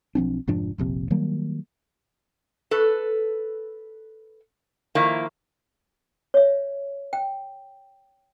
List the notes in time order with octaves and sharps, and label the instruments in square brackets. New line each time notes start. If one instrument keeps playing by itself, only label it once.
[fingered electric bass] B1 F3 C4 D4
F1 G#2 F3 D4
F1 A#1 C3
D#3 F#3 G3 A#3
[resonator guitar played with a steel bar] A4 B4
D#3 F3 A#3 E4
[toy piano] C#5 E5
G5